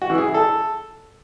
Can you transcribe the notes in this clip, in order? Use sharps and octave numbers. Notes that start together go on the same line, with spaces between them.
F#4
E3
G#4
E4
A4